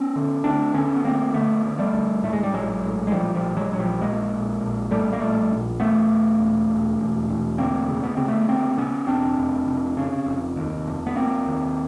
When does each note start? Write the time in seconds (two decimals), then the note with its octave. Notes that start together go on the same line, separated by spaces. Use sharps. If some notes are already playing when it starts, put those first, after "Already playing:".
Already playing: B3 C#4
0.16 D3
0.44 D2 C4 D4
0.74 D3 B3 C#4
0.96 B3
1.04 D2 A#3 C4
1.34 D3 A3 B3
1.64 D2
1.79 G3 A3
1.93 D2
2.23 A2 A3
2.33 G#3
2.43 G3
2.53 A#1 F#3 G#3
2.83 A2
3.07 G#3
3.12 A#1 F3 G3
3.35 F3 G3
3.42 A#1
3.57 F#3 G#3
3.72 A#1 F#3
3.80 F3 G3
4.01 A#1 G#3 A#3
4.32 A#1
4.61 A#1
4.91 A2 G3 A3
5.13 A#3
5.20 A#1 G3 A3
5.51 A#1
5.80 E1 A3 B3
6.10 E1
6.40 E1
6.69 E1
6.99 E1
7.29 E1
7.58 D2 A#3 C4
7.89 C#3
8.04 B3
8.17 C#3 C4
8.28 A3 B3
8.48 D2 A#3 C4
8.78 C#3 B3 C#4
9.07 E1 C4 D4
9.38 F1
9.67 F1
9.97 C#3
10.26 F1
10.56 D#2
10.86 F1
11.07 B3
11.15 F1 A#3 C4
11.46 D#2